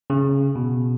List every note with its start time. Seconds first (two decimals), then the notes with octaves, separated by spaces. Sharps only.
0.10 C#3
0.56 B2